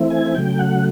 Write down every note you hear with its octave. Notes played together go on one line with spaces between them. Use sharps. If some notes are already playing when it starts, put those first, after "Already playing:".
Already playing: E3 A3 C4 E4
G#5
C#3 F#3 A3 G5
F#5